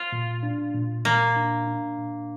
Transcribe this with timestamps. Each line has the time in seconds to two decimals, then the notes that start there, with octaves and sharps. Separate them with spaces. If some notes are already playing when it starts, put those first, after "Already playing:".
Already playing: F4
0.12 A#2
0.43 D4
0.74 A#2
1.05 A#2 A#3
1.36 D4
1.67 D4
1.98 A#2